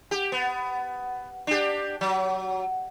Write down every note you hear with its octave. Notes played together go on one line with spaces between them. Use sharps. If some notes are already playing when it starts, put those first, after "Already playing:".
G4
B3
D4 G4
F#3